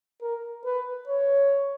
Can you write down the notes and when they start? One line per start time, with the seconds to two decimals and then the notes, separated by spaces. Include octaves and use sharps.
0.22 A#4
0.65 B4
1.07 C#5